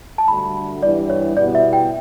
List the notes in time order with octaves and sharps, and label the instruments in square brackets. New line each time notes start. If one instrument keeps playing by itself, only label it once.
[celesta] A5
[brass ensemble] G2 D3 A3 D4 F#4 [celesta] B5
[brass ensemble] G2 E3 B3 E4 G4 [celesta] D5
[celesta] C#5
[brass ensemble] B2 G3 B3 E4 [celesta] D5
[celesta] E5
G5